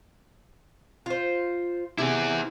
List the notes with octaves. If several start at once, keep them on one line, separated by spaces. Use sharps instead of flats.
F4 C5
C3 E4 G#4